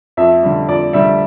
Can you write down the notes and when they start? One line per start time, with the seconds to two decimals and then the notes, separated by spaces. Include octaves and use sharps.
0.17 F2 E5
0.43 D3 G3
0.68 F2 D5
0.93 D3 G3 E5